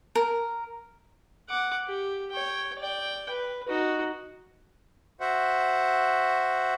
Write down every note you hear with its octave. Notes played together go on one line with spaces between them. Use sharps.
A#4
F#5 D6
G4
C#5 G5
D5 G5
B4
D#4 F#4
F#4 C5 E5 F#5